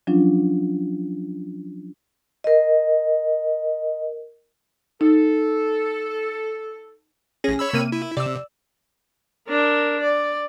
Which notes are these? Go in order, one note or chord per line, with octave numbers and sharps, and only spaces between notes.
F3 F#3 C#4 D4 F4
A#4 D#5
D#4 A4
A1 C#4 G#4 A#6
C#5 B5 E6
C3 A#3 D#7
E4
C3 D5 E6
D4 A#4
D5